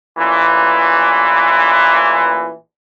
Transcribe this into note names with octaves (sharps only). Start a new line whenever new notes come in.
A1 A#2 E3